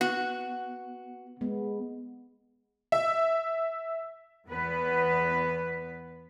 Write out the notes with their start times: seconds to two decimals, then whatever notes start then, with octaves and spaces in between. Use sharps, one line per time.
0.01 B3 F#4
1.41 G#3 B3
2.92 E5
4.48 E2 B3 B4